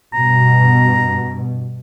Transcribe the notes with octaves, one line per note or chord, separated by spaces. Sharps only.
G2 B2 A#5